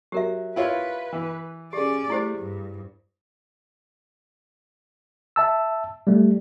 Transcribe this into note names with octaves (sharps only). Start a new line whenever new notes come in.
F#3 G4 A#4 E5
E4 F4 B4 C#5
E3
C#4 G4 G#4 D5
A3 E4 G4 C5
G2
E5 A5 E6
G3 A3